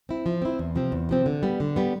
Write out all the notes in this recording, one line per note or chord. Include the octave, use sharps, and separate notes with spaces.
C4 E4
F3
C4 E4
E2
C3 F3 C4
E2
C3 F3 C4
D3
G3 B3
D3
G3 B3